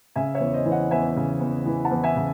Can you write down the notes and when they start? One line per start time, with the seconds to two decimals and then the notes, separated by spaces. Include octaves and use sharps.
0.16 C#3 E5 G#5
0.35 C#5 E5
0.40 E2
0.54 C5 D#5
0.65 E3
0.71 D#5 F#5
0.91 E2 E5 G#5
1.17 C#3
1.41 E2
1.66 E3
1.85 F#5 A5
1.91 E2
2.04 E5 G#5
2.16 C#3